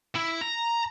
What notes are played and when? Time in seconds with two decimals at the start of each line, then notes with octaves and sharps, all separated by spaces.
0.15 E4
0.41 A#5